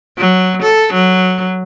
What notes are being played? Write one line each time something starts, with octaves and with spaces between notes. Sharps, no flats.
F#3
A4
F#3